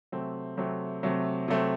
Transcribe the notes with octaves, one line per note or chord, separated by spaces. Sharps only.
C3 F#3 A3 C4
C3 F#3 A3 C4
C3 F#3 A3 C4
C3 F#3 A3 C4